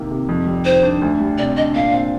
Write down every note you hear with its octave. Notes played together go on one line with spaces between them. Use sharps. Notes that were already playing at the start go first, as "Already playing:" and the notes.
Already playing: C3 D#3 A#3
C3
F2
G3
D#3 C5
D4
D2
G3
C3 D5
D4 D#5
A#2 F5
C4